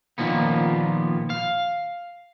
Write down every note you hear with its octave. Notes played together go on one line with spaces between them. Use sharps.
A#2 D#3 F3 A#3 B3
F5